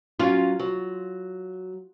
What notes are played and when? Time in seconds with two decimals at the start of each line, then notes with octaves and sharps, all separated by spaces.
0.20 F#3 C#4 F4
0.60 F#3